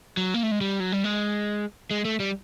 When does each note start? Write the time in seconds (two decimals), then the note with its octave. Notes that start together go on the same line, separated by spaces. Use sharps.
0.17 F#3
0.34 A#3
0.43 A3
0.51 G#3
0.61 G3
0.80 F#3
0.92 G3
1.04 G#3
1.91 G#3
2.05 A3
2.20 G3